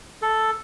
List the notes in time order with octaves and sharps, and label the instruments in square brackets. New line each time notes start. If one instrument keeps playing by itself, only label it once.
[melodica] A4